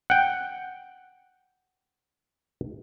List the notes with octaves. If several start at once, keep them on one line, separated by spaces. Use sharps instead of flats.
F#5 G5